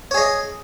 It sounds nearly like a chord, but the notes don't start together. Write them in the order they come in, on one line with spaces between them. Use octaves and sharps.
C#5 G#4 D#5